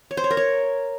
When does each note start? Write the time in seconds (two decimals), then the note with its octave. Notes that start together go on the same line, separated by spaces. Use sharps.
0.11 C#5
0.17 C5
0.24 C#5
0.31 A#4
0.37 C#5